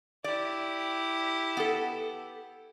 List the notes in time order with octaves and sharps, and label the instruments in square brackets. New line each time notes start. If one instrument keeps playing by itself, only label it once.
[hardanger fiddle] E4 G4 [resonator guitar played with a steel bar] D5
[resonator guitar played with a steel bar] B3 A4